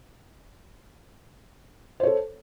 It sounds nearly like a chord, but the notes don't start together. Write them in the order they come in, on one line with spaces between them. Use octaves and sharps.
C5 C#5 A4